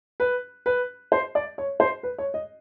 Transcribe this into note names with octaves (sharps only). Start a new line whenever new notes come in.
B4
B4
C5
D5
C#5
C5
B4
C#5
D#5